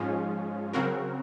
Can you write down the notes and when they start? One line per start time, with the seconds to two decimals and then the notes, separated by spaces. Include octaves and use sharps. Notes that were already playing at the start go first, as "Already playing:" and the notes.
Already playing: G#2 F3 G#3 C#4 F4
0.73 C#3 F#3 C4 F#4 A#4